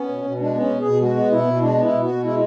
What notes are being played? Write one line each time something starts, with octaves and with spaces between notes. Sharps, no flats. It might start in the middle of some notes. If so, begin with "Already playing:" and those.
Already playing: B3 C#4
B2
B2
G#3 D4
B3
C#4
B2
G#4
B2
G#3 F#4
B3
B2 E4
B2
G#3 D4
B3 E4
B2
F#4
B2
G#3 E4